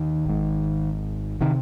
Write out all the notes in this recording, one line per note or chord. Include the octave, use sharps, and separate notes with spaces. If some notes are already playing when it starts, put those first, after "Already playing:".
Already playing: D#2 D#3
G#1 G#2
C3 D#3